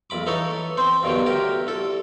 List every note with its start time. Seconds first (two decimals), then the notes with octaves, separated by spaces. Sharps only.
0.10 A#1 F2 B5 D6
0.26 E3 D#4 A4 C#5
0.77 C4 C5
1.03 G2 B2 D3 D#3 F#3
1.26 D2 G4 A#4
1.67 C2 A4